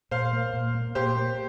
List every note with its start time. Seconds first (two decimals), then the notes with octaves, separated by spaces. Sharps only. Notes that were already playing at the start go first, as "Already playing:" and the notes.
0.11 A#2 C5 F5
0.33 A#3
0.54 A#2
0.75 A#3
0.95 A#2 G4 C5
1.16 A#3